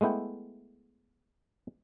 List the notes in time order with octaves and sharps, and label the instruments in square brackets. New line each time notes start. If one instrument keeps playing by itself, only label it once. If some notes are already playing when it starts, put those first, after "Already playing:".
[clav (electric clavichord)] G#3 A3 B3 E4 G5